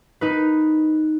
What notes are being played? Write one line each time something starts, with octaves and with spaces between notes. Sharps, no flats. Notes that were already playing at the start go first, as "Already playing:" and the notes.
D#4 B4